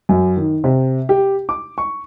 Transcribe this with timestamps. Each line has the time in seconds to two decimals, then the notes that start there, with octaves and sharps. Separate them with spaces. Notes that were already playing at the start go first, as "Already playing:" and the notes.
0.09 F#2
0.37 D#3
0.64 C3
1.09 G4
1.49 D6
1.78 C#6